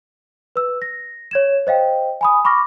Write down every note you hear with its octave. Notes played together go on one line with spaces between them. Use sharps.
B4 E6
A#6
C#5 G#6 E7
C5 D#5 F5 G5
G#5 B5 D#6
B5 C#6 D6 F6 A#6